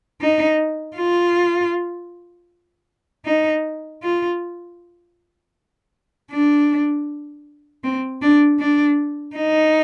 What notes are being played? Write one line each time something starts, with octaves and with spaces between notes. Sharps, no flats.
D#4
F4
D#4
F4
D4
C4
D4
D4
D#4